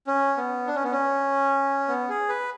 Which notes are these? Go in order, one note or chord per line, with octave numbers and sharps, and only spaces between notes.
C#4
B3
D4
C#4
B3
C#4
B3
G#4
B4